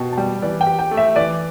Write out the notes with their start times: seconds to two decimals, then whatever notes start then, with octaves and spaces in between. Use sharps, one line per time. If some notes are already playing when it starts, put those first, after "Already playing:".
Already playing: B2 G5 A5
0.12 A5
0.17 G3 G5
0.42 E3 D5
0.61 G5
0.67 G4
0.79 G5
0.91 A3
0.97 E5
1.16 E3 D5